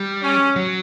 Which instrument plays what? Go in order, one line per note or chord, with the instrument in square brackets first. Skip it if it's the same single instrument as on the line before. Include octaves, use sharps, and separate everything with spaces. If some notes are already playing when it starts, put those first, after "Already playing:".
Already playing: [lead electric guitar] G3
[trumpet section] C#4
[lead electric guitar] F#3